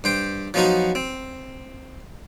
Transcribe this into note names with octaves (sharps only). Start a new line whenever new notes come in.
G2 C5 G5
F3 F#3 B3 D#4 F4 F#4
C4